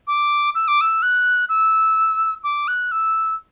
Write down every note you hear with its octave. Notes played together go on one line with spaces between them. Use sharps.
D6
E6
D6
E6
F#6
E6
D6
F#6
E6